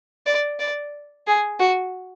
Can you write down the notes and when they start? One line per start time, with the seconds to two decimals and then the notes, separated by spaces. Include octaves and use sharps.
0.26 D5
0.60 D5
1.27 G#4
1.60 F#4